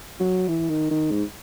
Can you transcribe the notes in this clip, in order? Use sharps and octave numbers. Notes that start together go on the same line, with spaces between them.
F#3
E3
D#3
D#3
G#2